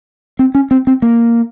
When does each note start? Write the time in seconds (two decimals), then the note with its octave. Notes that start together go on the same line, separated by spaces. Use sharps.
0.39 C4
0.55 C#4
0.71 C4
0.87 C4
1.02 A#3